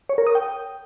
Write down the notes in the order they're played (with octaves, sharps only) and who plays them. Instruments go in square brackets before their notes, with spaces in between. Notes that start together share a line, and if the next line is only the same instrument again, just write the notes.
[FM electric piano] C#5
A#4
D#6
G5